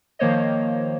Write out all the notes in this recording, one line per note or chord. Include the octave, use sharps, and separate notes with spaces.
D#3 F3 A#3 C5 C#5 D#5